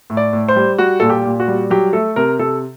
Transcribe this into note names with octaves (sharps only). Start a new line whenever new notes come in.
A2
D5
A2
C5
G3
G3 F#4
A#2 A4
G4
A#2
F#4
G3
F#3 G4
A3 A4
C3 A#4
C3 A4